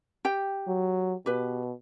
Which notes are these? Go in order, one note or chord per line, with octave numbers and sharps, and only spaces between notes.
G4 G5
F#3
B2 G4 B4